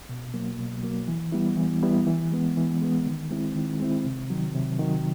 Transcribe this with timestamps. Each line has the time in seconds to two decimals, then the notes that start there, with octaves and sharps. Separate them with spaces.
0.09 B2
0.34 F#3 A#3
0.58 B2
0.83 F#3 A#3
1.08 E3
1.32 G3 B3 E4
1.57 E3
1.83 G3 B3 E4
2.07 E3
2.32 G#3 B3
2.57 E3
2.82 G#3 B3
3.06 D#3
3.30 G#3 C4 E4
3.56 D#3
3.80 G#3 C4 E4
4.04 C3
4.30 D#3 F#3
4.55 C3
4.79 D#3 F#3